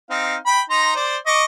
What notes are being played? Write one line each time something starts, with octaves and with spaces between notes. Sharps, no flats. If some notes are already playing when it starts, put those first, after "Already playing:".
C4 D#4 F5
G5 B5
D#4 A#5 C6
C5 D5
D#5 C#6 D6